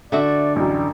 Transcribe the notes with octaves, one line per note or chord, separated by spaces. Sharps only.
D3 A3 F#4 D5 E5
A1 F#2 G3